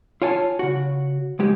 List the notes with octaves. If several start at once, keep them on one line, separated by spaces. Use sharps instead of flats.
F4 C#5 G#5 A5
C#3 F#4
C#2 G#3 G4